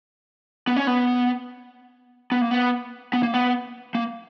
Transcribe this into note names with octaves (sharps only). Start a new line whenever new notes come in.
B3
C#4
B3
B3
A#3
B3
B3
A#3
B3
A#3